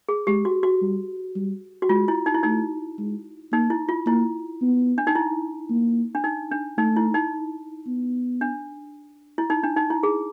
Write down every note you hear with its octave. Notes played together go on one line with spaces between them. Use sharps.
G#4
G#3 G4
F#4
F#4
G3
G3
F#4
G#3 F4
E4
D#4
E4
A3 D#4
G#3
A#3 D#4
E4
F4
A#3 E4
B3
D4
D#4
E4
A#3
D4
D#4
D4
A3 D#4
E4
D#4
B3
D4
E4
D#4
D4
D#4
E4
G#4